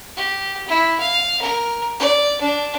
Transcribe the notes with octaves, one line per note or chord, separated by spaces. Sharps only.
G4
E4
F5
A#4
D5
D4